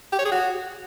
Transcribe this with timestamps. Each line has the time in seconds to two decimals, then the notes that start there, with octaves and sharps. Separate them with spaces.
0.12 G4
0.19 C#5
0.25 G#4
0.32 F#4